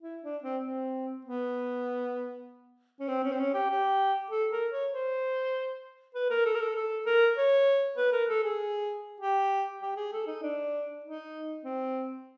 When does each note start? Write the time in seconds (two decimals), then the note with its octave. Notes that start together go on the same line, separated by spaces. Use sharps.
0.02 E4
0.23 D4
0.43 C4
0.64 C4
1.25 B3
3.00 C#4
3.08 C4
3.24 C#4
3.31 C4
3.39 C#4
3.54 G4
3.70 G4
4.30 A4
4.51 A#4
4.71 C#5
4.92 C5
6.15 B4
6.30 A#4
6.45 A4
6.55 A#4
6.60 A4
6.76 A4
7.06 A#4
7.37 C#5
7.97 B4
8.13 A#4
8.29 A4
8.44 G#4
9.20 G4
9.82 G4
9.97 G#4
10.12 A4
10.27 D#4
10.42 D4
11.04 D#4
11.65 C4